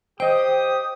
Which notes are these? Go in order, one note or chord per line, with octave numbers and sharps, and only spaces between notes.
G4 C5 D#5 G5 D#6